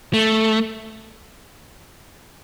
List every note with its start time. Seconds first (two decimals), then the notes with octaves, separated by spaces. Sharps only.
0.14 A3